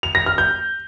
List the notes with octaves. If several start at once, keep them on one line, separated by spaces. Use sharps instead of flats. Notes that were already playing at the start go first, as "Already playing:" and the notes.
F7
A#6
F6
G6